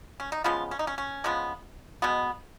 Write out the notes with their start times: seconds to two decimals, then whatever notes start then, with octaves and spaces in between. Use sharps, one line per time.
0.20 C#4
0.32 D#4
0.44 C#3 F3 G#3 B3 F4
0.71 C#4
0.79 D#4
0.87 C#4
0.98 C#4
1.24 C#3 F3 G#3 B3
2.02 B2 G#3 B3